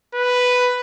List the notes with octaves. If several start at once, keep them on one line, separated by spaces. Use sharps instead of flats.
B4